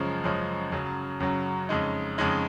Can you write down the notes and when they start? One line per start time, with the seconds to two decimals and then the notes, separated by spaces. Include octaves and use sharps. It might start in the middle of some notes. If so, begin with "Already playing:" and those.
Already playing: F#2 C#3 F3 G#3
0.24 F#2 C#3 F3 G#3
0.72 F#2 C#3 F#3
1.20 F#2 C#3 F#3
1.69 F2 C#3 G#3 D#4
2.18 F2 C#3 G#3 D#4